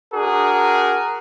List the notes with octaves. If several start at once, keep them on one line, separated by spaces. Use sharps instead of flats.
D4 F#4 G#4 A#4